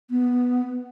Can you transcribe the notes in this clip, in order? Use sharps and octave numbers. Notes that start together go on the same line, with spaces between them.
B3